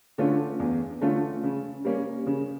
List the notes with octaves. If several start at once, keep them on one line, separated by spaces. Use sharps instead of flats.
D3 A3 C#4 F4
E2
D3 A3 C#4 F4
C#3
G3 A#3 C#4
C#3